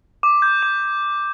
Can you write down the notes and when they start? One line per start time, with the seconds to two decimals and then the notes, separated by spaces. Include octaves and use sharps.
0.23 D6
0.42 G6
0.63 D6